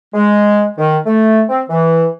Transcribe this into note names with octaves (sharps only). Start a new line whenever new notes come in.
G#3
D#3
A3
C4
E3